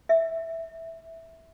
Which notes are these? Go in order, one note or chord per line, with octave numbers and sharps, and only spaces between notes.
E5